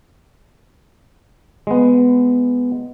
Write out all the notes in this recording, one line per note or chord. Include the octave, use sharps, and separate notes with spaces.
G#3 B3